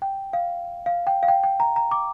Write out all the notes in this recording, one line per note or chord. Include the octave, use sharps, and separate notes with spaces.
G5
F5
F5
G5
F5
G5
G5
A#5
A#5
D6